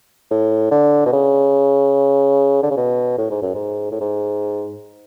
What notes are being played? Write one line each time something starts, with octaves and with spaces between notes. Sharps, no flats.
A2
D3
B2
C#3
D3
C#3
B2
A2
G#2
F#2
G#2
A2
G#2